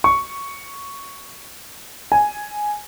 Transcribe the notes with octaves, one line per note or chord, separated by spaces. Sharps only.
C#6
G#5